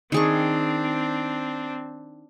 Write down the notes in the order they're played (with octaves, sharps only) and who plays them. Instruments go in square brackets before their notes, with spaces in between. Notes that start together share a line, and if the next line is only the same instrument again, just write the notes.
[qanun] D#3 G#4 C#6 [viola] C4 D4